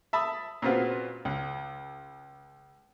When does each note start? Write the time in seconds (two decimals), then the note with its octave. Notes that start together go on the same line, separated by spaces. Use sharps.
0.13 E5 A5 B5 D#6
0.62 A#2 C#3 B3 C4 F4 F#4
1.25 C#2